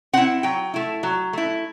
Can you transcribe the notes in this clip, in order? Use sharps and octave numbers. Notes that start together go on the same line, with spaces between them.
C4 E4 F#5
F#3 G5
A3 E4
F#3
A3 E4